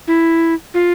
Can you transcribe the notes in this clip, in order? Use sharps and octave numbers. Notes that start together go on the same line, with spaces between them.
E4
F4